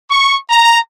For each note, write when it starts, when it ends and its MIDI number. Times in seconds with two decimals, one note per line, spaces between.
0.10 0.37 85
0.49 0.78 82